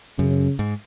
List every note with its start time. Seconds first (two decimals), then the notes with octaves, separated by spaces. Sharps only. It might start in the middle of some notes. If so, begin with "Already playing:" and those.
0.18 F#2 C#3
0.59 G#2